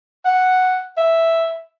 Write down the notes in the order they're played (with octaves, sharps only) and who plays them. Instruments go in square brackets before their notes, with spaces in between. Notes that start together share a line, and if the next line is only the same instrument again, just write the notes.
[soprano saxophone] F#5
E5